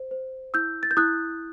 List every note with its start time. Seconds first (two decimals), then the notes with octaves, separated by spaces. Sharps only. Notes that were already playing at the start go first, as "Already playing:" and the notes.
Already playing: C5
0.11 C5
0.54 E4 E6 G6
0.83 A6
0.91 G6
0.97 E4 D#6 F#6